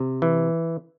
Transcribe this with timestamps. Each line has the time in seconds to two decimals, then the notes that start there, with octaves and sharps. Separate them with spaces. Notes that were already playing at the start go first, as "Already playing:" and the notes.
Already playing: C3
0.22 E3